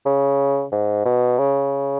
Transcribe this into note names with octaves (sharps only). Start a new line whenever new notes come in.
C#3
G#2
B2
C#3